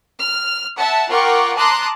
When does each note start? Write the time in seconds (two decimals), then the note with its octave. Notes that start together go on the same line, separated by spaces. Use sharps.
0.18 F6
0.77 E5 F#5 A5
1.09 F4 A#4 F#5 G5 C#6 D6
1.57 A5 A#5 C6 D6 D#6 F#6